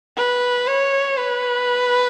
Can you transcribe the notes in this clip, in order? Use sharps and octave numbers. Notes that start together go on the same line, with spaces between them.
B4
C#5
B4